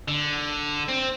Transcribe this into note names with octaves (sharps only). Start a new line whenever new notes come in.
D3
C4